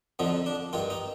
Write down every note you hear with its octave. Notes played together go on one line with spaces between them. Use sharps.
F2 D3 F3 D#4
D4
G2 D#3 F4
D#4